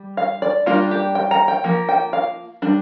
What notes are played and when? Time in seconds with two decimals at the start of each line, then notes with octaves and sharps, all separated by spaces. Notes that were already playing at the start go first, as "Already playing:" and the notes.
Already playing: G3
0.17 F5
0.42 D5
0.66 G3 A#3 D4 F4
0.91 G4
1.15 G5
1.31 A#5
1.48 G5
1.64 F3 A#3
1.89 G5
2.13 F5
2.62 G3 D4